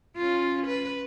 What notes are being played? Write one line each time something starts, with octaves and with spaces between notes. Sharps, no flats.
C#4 F4
B4